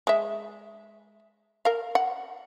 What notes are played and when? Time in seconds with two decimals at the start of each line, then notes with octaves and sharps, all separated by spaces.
0.07 G#3 E5
1.65 A#4 F5
1.95 F#5